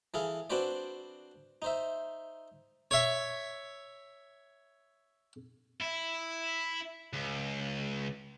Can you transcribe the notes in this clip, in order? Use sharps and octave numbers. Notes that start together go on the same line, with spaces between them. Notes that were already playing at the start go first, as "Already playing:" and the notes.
E3 G#4 A4 F5
C4 D4 F#4 B4 C5 D5
D#4 C5 E5
C#5 E5
E4
C#2